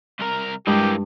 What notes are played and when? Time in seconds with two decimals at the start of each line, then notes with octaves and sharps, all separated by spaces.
0.19 C2 A#4
0.67 G2 E3 G#3 A#3 G4